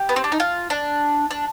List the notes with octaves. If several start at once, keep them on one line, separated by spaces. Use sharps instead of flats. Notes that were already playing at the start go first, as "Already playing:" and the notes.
Already playing: G4
B3
C4
D4
D#4
F4
D4
D4